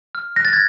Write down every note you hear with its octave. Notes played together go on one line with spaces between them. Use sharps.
F6
F#6 A#6
A6
G#6 A#6